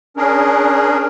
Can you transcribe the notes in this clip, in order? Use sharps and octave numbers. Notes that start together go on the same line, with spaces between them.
C#4 D4 G#4 A#4